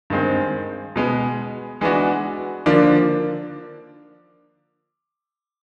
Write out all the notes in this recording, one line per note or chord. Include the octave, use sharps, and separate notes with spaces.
G2 D#3 G#3 C4
B2 G#3 B3
E3 G#3 B3 D4 F#4
D3 F3 A#3 D4